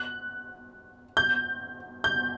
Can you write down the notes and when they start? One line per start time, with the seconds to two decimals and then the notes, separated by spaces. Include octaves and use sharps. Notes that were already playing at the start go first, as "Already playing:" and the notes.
Already playing: F#6
1.17 G6
2.04 G6